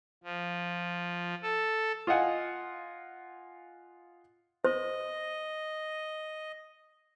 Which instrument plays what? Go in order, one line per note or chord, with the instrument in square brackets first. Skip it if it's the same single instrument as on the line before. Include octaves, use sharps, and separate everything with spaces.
[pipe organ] F3
A4
[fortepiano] F4 D#5 F5 F#5 G#5
[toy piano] C5 [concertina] D#5